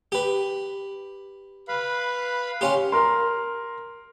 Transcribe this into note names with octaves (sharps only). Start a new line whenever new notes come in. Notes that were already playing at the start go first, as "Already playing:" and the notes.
G4 B4
B4 F5 B5
C#4 F4 G4
A#4 C6